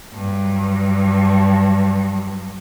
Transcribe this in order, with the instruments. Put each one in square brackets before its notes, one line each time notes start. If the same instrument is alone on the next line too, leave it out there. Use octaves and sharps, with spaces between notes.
[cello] G2 F#3